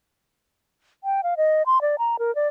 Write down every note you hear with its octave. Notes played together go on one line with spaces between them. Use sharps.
G5
F5
D#5
C6
D5
A#5
A#4
D5